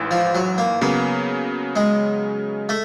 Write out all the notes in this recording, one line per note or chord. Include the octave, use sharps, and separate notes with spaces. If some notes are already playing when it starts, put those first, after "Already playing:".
Already playing: A1 G#2 E3
F3
F#3
A#3
C#3 F#3 A#3 B3
G#3
A3